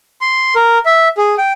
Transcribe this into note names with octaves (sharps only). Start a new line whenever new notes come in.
C6
A#4
E5
G#4
G5